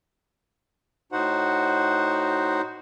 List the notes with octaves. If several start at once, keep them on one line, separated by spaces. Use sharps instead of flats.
A2 D#4 F#4 C5 F#5